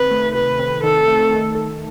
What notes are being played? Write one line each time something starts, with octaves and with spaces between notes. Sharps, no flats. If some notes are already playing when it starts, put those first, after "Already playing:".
Already playing: C3 D#3 C4 B4
A3
C3 B4
C4
D#3 A4
A3
D#3
A4